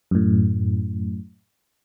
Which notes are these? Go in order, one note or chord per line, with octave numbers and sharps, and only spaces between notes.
F#2 A2